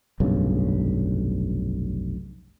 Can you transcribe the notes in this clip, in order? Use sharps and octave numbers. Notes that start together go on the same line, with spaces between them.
F1 B1 G2 C#3